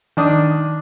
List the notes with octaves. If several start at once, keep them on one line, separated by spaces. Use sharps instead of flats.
D#3 D4 D#6